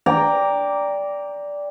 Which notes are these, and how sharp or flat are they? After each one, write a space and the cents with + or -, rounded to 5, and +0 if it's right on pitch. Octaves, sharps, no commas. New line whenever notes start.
D5 -10 G5 +15 A#5 +0